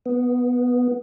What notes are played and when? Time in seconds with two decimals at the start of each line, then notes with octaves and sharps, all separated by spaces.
0.06 B3